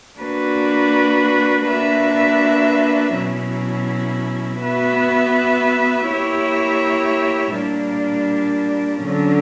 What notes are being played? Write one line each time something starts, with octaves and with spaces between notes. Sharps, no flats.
A#3 D4 F#4 B4
A#3 D4 F#4 B4 E5
B2 F#3 C#4 E4
B3 F#4 B4 E5
A#3 E4 G4 C#5 E5
A#2 G3 A#3 D4
D3 F#3 C#4